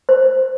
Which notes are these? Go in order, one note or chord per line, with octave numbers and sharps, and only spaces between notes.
C5